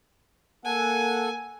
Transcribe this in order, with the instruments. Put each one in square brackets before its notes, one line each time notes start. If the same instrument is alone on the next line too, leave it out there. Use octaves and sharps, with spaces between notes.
[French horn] A#3 [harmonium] A4 F#5 [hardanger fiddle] G#5